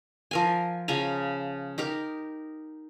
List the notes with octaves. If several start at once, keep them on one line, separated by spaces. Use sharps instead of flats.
F3 A#4 G#5
C#3 F3 G#5 A#5
D#4 G4 A#4